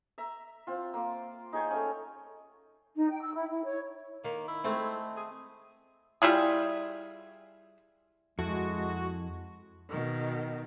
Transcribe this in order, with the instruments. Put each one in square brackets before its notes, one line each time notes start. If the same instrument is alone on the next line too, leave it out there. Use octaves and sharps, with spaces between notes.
[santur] E5 A#5
C4 F4
A#3 C6 D6
D#4 G#4 C#5 G5
A3 C#4
[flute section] D#4
G5
E6
E4
E4
C#5
[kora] D#3 [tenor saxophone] A#3
[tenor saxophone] E4
[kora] G#3 A3 C4
[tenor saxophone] G#4
[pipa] G3 E4 F4 G#4
[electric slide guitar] F2 E4 A4 [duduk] G#3 [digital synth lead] F#4
[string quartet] B2 D#3